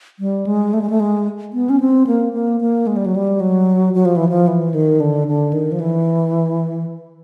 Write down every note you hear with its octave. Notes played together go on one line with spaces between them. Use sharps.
G3
G#3
A3
G#3
A3
G#3
B3
C#4
C4
A#3
A#3
A#3
G#3
G3
F#3
G3
F#3
F#3
F3
E3
F3
E3
D#3
D3
D3
D#3
F3
E3